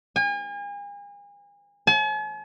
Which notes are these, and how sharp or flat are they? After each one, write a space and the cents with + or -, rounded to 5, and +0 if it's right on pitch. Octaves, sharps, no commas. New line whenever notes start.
G#5 -40
G#5 +45